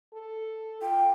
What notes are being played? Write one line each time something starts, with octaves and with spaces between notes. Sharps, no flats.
A4
F4 G5